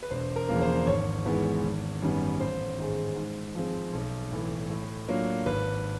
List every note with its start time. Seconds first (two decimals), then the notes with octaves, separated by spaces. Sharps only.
0.03 B4
0.10 E1 C5
0.36 A#4
0.49 E2 C#3 F3 A#3
0.61 C5
0.87 G#1 C#5
1.25 G#2 E3 G#3 B3
1.64 G#1
2.02 F#2 D#3 G3 B3
2.40 A1 C5
2.78 G#2 D#3 G#3
3.16 G#2
3.55 F3 G#3 C4
3.93 B1
4.31 A2 E3
4.70 A2
5.08 F#3 A#3 D4 F4
5.46 G#1 B4